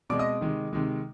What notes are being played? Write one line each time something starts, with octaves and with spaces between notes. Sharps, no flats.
B2 G#3 C4 D5 D6
D#5 D#6
C3 D#3 G#3
C3 D#3 G#3